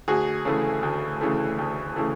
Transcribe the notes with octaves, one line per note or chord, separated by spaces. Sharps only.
D2 F#4 G#4
C#3 E3 A3
D2
C#3 E3 A3
D2
C#3 E3 A3